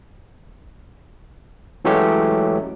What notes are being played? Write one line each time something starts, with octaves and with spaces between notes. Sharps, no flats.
E3 F#3 G#3 A3 C#4 G4